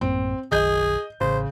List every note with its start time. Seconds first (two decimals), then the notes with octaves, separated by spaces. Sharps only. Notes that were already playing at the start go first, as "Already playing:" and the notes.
0.01 A1 F#2 A#3 C4
0.52 F#1 B1 D#3 G#4 D#5 G6
1.21 A1 C#3 C5